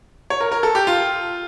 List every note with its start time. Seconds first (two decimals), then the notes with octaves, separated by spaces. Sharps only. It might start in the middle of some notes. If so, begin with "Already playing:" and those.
0.30 C#5
0.41 A#4
0.52 A#4
0.63 A4
0.75 G4
0.87 F4